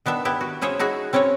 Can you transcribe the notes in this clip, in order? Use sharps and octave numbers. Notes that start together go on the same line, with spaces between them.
D#3 B3 D4 E5
B3 E4 G4
F#4
C#4 E4 G#4 C5 C#5
D#4 E4 F#4 G#4
C4 C#4 E4 B4 C#5